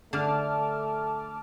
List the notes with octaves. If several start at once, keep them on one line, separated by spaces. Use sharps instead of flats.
D3 A3 A5 D6 F6